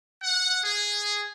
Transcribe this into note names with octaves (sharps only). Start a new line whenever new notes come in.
F#5
G#4